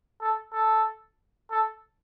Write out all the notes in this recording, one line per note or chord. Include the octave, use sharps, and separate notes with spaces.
A4
A4
A4